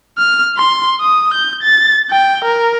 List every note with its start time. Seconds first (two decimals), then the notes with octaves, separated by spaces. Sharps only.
0.18 F6
0.58 C6
1.01 D#6
1.34 G6
1.63 A6
2.10 G5
2.45 A#4